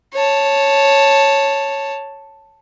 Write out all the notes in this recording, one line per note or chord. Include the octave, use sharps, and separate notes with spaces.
C#5 A5